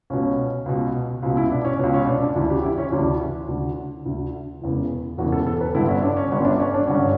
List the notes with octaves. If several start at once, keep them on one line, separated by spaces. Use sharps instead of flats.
C#2 B2 C#4
C#2 B2
C#2 B2
E4
D4
C#4
C#2 B2
C#4
D4
D4
D2 C#3 E3 D4
G4
E4
C#4
D2 C#3 E3 D4
D2 D3
D2 D3
E1 E2 C#3 E3
E1 E2 C#3 E3 F#4
A4
A4
B4
G1 G2 D3 E4
C#4
D4
C#4
G1 G2 D3 C#4
D4
C#4
D4
G2 D3 C#4